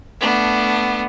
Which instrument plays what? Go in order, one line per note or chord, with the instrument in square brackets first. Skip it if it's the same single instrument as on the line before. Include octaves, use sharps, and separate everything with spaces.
[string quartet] A3 B3 D4